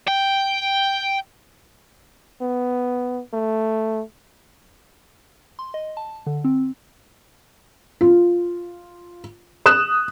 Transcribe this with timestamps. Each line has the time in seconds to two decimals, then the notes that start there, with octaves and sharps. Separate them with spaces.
0.08 G5
2.41 B3
3.33 A3
5.59 C6
5.74 D#5
5.97 A5
6.26 D3
6.44 C4
8.01 F4
9.66 D#6 F#6 E7